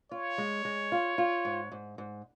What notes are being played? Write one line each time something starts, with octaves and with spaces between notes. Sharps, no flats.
F4 C#5
G#3
G#3
F4
F4
G#2
G#2
G#2